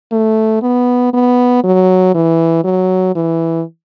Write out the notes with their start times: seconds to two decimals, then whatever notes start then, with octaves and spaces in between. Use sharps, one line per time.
0.12 A3
0.62 B3
1.14 B3
1.64 F#3
2.14 E3
2.64 F#3
3.15 E3